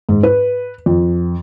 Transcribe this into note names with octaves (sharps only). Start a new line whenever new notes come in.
G#2
B4
F2